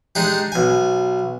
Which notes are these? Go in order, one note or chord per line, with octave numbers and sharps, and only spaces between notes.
G#3 D4 D#4 G4
B1 G#5